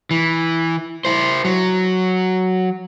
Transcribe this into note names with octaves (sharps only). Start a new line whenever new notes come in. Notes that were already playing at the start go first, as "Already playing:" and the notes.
E3
E4 C5
F#3